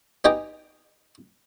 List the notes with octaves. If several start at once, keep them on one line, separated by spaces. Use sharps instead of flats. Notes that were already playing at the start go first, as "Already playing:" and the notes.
B3 D#4 G4 D#5 G5 G#5